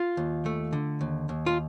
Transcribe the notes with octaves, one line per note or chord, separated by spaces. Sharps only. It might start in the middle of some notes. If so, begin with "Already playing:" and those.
Already playing: F4
D#2
A3
D3
D#2
D#2
F4